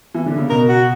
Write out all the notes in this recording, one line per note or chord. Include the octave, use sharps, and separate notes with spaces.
E3
D3
C#3
B2 A#4
F#4